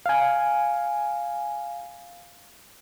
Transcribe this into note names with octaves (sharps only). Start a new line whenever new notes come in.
F5 G#5